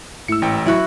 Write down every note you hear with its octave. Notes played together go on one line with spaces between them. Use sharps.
G#2 A3 E4 E6 C#7
A1 G5
F#3 E4 F#4 B4